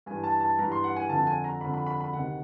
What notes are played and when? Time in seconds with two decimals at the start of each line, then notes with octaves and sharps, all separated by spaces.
0.06 G2 E3 G#5
0.24 A5
0.41 A5
0.59 G2 E3 A#5
0.72 C6
0.84 F#5
0.96 G#5
1.09 F2 D3 A5
1.27 G#5
1.44 A#5
1.61 F2 D3 B5
1.74 B5
1.86 B5
2.01 B5
2.13 D2 C3 D#3 F#5